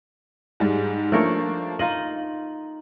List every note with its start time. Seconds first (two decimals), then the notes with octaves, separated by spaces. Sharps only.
0.60 G#2 G3 G#3
1.12 F3 A3 A#3 D4 A#4 C#5
1.79 D#4 F4 D#5 F#7